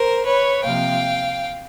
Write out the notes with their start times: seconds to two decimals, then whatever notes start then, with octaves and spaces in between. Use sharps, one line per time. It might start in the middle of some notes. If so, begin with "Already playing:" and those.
Already playing: A#4 C5
0.25 B4 C#5
0.63 C3 F3 A#3 F5 G5